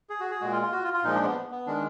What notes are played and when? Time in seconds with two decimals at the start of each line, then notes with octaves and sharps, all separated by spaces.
0.10 G#4
0.20 F#4
0.31 G#4
0.41 A#2 G#3 F#4
0.52 F4
0.62 F4
0.72 F#4
0.84 F4
0.94 F4
1.04 A#2 F3 G#3 D#4
1.15 D4
1.25 B3
1.51 B3
1.67 D#3 G#3 D4